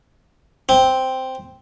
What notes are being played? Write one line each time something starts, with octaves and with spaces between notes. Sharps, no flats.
C4